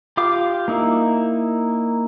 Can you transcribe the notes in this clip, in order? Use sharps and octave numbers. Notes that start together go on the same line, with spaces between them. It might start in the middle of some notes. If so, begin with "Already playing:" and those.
F4 G4 F5 D6
A#3 D#4 E4